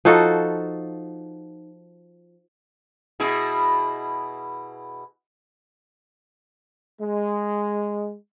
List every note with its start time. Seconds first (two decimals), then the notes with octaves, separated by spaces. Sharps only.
0.05 F3 D#4 F#4 A4
3.20 B2 E4 G#4
7.00 G#3